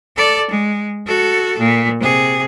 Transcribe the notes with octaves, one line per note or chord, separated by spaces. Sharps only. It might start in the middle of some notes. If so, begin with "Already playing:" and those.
A4 D5
G#3
F#4 A4
A#2
C3 G#4